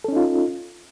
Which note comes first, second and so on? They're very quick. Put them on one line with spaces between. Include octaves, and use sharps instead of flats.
A4 C#4 D#4 F4